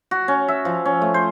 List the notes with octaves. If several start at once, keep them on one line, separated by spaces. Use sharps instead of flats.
F#4
C#4
E5
F3
C#4
A3
C5